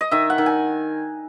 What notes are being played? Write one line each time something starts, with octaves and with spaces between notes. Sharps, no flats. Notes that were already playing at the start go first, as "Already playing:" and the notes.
D#5
D#3 E5
F#5
D#3
G#5